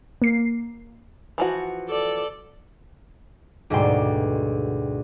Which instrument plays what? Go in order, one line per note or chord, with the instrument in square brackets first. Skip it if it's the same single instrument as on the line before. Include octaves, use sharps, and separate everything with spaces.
[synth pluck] A#3 C7
[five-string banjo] E3 F3 F#4
[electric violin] A4 D5
[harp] D2 G#2 B2 G3 G5 C6